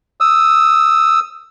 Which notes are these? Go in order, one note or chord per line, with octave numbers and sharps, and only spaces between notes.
D#6 E6